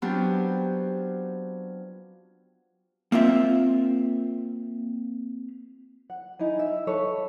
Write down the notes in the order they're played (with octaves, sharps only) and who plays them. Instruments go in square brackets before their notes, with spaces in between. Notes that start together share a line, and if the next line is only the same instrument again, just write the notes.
[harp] F#3 B3 C4 D4 F4 G4
[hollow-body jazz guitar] A#3 C4 F4 E5
[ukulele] F#5
D#4 E4 G#5
E5
A4 B4 C#5